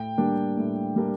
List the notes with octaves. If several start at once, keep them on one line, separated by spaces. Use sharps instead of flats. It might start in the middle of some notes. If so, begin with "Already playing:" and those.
Already playing: A2 G5
G3 A#3 D4
A2
G3 A#3 D4